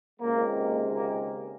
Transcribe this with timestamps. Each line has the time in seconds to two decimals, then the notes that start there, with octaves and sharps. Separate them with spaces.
0.20 C#2 C3 D#3 G#3 A#3
0.93 A#3